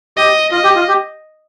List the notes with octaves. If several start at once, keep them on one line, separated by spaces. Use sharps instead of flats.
G4 D#5
F4 D#5
G4
F4
G4